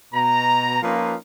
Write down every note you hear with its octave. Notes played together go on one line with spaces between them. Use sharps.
B2 A#5
F3 A#3 C#4 D#4 F4 B4